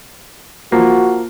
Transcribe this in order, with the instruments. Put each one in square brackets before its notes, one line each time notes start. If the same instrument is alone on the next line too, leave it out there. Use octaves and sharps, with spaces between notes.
[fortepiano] F3 A#3 [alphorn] F#4